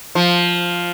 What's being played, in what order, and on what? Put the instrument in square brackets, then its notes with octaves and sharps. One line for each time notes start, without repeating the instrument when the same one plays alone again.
[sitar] F3